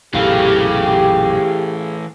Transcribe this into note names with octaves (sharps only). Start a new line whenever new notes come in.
B1 F#2 A#2 E3 A3 G4 G#4 F5